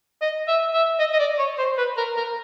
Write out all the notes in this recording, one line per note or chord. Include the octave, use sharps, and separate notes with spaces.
D#5
E5
E5
D#5
D#5
D5
C#5
C5
B4
A#4
A#4